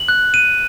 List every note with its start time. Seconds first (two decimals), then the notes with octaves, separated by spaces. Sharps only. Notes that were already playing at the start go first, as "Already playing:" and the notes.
Already playing: F#7
0.08 F#6
0.34 D#7